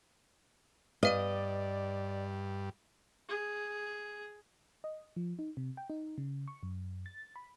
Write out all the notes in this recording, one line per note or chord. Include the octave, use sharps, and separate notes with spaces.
G2 B4 D5 D#5 F5 D#7
G#4
D#5
F3
D#4
C3
G5
D#4
C#3
C#6
F#2
A6
B5